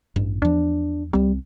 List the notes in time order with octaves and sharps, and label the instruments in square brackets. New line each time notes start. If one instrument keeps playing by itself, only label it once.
[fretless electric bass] A1 G2
[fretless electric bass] E2 F3 [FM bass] D4
[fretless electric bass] C2 C4 [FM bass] G3